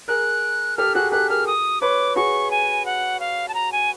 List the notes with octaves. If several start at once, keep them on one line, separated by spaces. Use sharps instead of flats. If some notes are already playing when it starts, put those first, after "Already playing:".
G#4 A#4 F#6
G4 A4 F6
F#4 G#4 F#6
G4 A4 F#6
G#4 A#4 F6
D#6
B4 C#5 D6
F#4 G#4 C#6
G#5
F#5
F5
A5
A#5
G#5